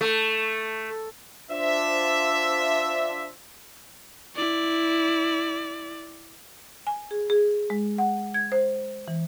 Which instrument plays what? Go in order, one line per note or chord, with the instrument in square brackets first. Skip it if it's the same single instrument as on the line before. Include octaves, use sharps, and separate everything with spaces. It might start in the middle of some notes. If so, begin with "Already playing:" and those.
[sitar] A3
[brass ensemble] D4 F4 C5 E5
[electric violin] E4 D5
[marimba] G#5
G#4
G#4
G#3
F#5
G#6
C5
E3